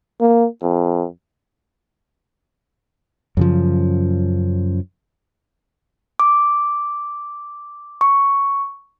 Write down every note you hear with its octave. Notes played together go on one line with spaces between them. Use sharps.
A#3
F2
F#2 C#3 F3
D6
C#6